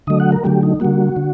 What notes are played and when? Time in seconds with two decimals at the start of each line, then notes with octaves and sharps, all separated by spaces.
0.07 D3 F#3 A3 D#5
0.20 F#5
0.32 A#4
0.44 D3 F#3 A3 G4
0.63 D#4
0.80 D3 G3 A#3 F#4
1.16 D3